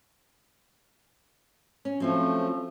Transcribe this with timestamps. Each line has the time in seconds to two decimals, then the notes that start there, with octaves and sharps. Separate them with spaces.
1.85 C#4
2.00 F3 F#3 A3 C4 C#4